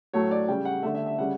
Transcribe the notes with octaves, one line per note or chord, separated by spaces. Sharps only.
A2 F#3 A3 C#5
D5
C#3 G3 G5
F#5
D3 A3 E5
E5
E5
C#3 G3 F#5